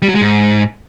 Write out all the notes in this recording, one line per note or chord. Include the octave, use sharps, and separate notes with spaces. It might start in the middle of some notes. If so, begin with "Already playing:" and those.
G3
F#3
G#3
G#2